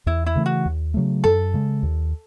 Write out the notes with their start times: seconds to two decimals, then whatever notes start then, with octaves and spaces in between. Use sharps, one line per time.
0.06 E2 E4
0.26 E4
0.35 C#3 E3 A3
0.46 F#4
0.65 D#2
0.94 C#3 F#3 A3
1.24 F#2 A4
1.54 C#3 G#3
1.83 D#2